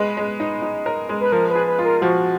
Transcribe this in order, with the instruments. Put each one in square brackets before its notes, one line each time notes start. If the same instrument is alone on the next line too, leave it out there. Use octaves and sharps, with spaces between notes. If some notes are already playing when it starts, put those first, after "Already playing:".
Already playing: [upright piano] G#3 B4
G#3
D#4
D#4
A#4
G#3
[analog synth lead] B4
[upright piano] F3 [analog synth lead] A#4
[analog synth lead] B4
[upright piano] G#4
[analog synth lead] B4
[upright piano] F4
[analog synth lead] A#4
[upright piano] F3 [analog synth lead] F#4